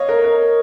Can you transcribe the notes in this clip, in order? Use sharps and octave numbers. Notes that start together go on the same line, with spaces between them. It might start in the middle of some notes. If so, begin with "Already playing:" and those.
Already playing: C#5 D#5 F5
A#4
A#4